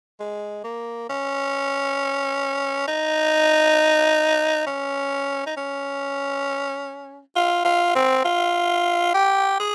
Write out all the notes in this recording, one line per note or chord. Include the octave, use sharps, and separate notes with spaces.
G#3
A#3
C#4
D#4
C#4
D#4
C#4
F4
F4
C4
F4
G4
G#4